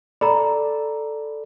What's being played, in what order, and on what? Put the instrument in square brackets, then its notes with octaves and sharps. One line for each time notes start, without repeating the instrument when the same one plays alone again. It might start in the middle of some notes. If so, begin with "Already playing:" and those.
[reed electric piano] A4 D5 [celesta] A#5 B5